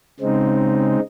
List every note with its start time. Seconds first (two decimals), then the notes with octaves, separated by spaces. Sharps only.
0.20 C#3 G#3 C4 D#4